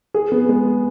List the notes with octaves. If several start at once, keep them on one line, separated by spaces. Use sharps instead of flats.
G#4
B3
G#3